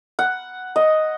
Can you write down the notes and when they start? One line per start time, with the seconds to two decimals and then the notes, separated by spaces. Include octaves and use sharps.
0.19 F#5
0.76 D#5